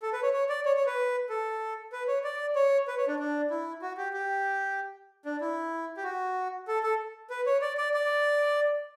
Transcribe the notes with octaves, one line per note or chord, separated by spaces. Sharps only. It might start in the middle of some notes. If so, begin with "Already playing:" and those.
A4
B4
C#5
C#5
D5
C#5
C#5
B4
A4
B4
C#5
D5
C#5
B4
C#5
D4
D4
E4
F#4
G4
G4
D4
E4
G4
F#4
A4
A4
B4
C#5
D5
D5
D5